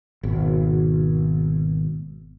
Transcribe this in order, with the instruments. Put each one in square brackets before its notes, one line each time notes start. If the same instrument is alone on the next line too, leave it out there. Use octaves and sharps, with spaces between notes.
[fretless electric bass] G#1 B2